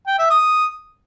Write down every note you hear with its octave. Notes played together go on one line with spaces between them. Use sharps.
G5
E5
D#6